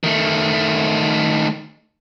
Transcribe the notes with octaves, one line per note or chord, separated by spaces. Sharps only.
D#3 A3